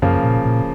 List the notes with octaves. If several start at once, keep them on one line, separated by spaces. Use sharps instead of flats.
F#2 C#3 F3 A#3
A#2
A#2